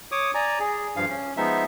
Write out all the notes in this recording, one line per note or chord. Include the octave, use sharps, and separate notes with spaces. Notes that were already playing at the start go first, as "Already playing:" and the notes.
C#5 D6 D#6
D5 G#5 A#5
G#4
G2 F3 F5
C#4
F3 G#3 B3 D#4 E5